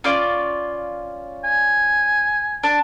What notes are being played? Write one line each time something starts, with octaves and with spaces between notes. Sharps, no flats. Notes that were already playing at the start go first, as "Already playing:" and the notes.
C#4 F4 D5
G#5
D4